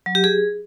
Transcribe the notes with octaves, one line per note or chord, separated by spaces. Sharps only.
F#3
G4
G#4